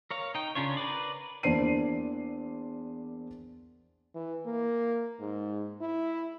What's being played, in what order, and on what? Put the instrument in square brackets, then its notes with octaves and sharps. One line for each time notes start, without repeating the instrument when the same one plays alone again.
[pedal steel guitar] A#4 C#5 F5
D#4 G5
C#3 C#4 D4 F4 C#5
A#4 B4 D5
[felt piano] E2 A#3 D4 C5 C7 D#7
[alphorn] E3
A#3
G#2
E4